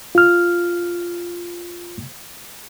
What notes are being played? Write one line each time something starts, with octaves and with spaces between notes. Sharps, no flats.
F4 F6